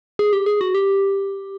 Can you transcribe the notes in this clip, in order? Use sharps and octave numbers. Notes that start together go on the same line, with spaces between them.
G#4
G4
G#4
F#4
G4